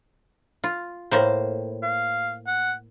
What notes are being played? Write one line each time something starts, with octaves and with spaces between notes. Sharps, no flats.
F4
A2 A#3 C5
F5
F#5